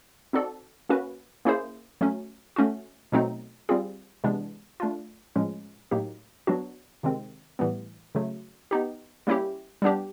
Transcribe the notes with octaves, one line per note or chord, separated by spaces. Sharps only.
C4 D#4 F#4 A4 D5
A#3 C#4 F#4 B4
A#3 C#4 E4 G#4 C5
F#3 A3 C#4
A3 C#4 F#4
B2 F#3 A3 C4 D#4
G3 C4 F4 G#4
C3 E3 G#3 B3 D4
A3 D4 F4
A2 F3 G#3 C#4
A2 F#3 A#3 D#4 G4
F#3 B3 D4 F#4
C3 D#3 G#3 C4
A2 E3 G3 B3
C#3 F#3 A3
B3 D#4 G4
G3 A#3 C#4 E4 G4
G3 B3 D4 G4